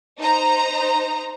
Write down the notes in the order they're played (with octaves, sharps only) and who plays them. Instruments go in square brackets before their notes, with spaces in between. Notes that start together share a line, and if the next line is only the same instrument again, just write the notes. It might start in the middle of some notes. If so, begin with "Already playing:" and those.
[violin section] D#4 C5 A#5